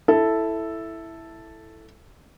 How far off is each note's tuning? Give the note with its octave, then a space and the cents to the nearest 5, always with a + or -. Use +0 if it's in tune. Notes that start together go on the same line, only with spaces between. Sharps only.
E4 +0 A4 +0